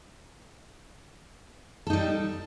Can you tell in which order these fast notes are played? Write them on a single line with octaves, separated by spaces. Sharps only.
A4 D#4 G3